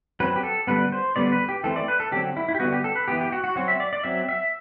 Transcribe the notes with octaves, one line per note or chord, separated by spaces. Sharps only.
F#3 C4 B4
G4
A4
D3 G3 B3 B4
C5
D3 G3 B3 D5
B4
G4
E3 A3 C4 A4
D5
B4
A4
D3 F#3 C4 G4
E4
E4
G4
D3 G3 B3 F#4
G4
A4
B4
E3 B3 G4
G4
F#4
F#4
F#3 C4 F#4
E5
D5
D5
F#3 C4 E5
E5